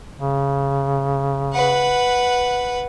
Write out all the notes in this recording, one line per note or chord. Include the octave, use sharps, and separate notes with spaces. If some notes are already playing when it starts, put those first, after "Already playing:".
C#3
B4 F#5